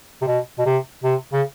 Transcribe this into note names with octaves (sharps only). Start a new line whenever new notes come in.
C3
B2
B2
C3
C3
C#3